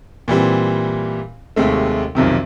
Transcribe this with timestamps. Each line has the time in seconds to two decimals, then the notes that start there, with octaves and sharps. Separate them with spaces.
0.28 A#2 E3 G3 C4
1.56 D#2 C3 G#3 A3
2.15 B1 F2 C3 D#3